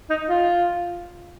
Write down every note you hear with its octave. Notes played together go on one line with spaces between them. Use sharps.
D#4
F4